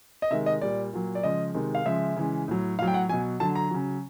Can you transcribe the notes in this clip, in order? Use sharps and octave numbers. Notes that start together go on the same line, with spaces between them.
D#5
C3 D#3 G#3 E5
D#5
A#2 G3 D5
A#2 F#3
D5
C#3 F3 G#3 D#5
C3 D#3 G#3
F5
C#3 F3 G#3 E5
C#3 E3 G#3
A2 F#3
A2 F#3 F5
G5
F#5
B2 F#3 G#5
D3 F#3 A5
A#5
C#3 F#3